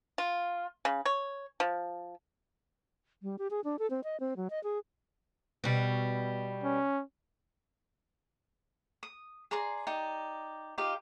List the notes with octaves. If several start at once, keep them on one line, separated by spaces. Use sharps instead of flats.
F4
C#3
C#5
F3
G3
G4
G#4
D4
A4
C4
D#5
C4
F#3
D#5
G#4
B2 G3
C#4
D#6
G#4 D5 A#5 C6
D#4 G4 D5
D#4 F4 G4 F5